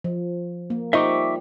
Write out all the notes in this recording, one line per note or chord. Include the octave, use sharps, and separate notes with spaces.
F3
A#3
G3 C4 D#4 F4 D#5 E5 C#6 D6